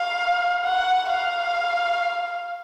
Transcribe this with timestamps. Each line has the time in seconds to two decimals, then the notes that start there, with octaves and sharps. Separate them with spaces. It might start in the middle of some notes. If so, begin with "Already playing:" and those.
Already playing: F5
0.64 F#5
1.10 F5